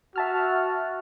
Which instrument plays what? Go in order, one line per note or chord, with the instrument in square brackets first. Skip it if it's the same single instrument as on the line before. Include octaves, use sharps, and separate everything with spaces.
[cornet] F#4 [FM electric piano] E5 A5 F6